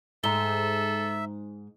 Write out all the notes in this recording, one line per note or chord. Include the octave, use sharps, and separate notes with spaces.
G#2 A4 E5 A#5 G7